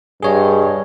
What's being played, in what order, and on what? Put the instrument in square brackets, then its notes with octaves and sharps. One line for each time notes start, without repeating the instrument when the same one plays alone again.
[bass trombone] G2 [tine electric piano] G#4 C#5 D#5